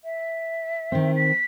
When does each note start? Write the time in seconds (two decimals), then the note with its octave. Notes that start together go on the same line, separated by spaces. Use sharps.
0.05 E5
0.92 D#3 C4
1.16 B6